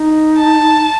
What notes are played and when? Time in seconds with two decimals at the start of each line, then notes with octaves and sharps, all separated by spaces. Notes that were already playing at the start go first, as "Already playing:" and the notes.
Already playing: D#4
0.38 A5